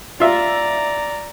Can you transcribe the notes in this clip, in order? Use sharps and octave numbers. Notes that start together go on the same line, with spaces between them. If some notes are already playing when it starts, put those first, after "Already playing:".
F4 D5 E5 A#5